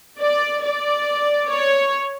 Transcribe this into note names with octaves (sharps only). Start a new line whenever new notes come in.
D5
D5
C#5